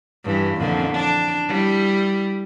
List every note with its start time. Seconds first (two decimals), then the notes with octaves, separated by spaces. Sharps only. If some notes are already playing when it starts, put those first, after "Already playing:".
0.24 G2 E3
0.57 F2 A#2 D3
0.93 D4
1.48 G3 E4